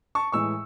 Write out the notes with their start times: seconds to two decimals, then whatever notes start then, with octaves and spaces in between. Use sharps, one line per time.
0.15 A5 C#6
0.32 A2 E3 G#3 C#6 E6